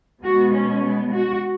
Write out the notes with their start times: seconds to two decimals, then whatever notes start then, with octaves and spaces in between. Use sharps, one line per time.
0.22 B2 G#3 B3 F#4
0.53 C#4
0.83 B3
1.13 F#4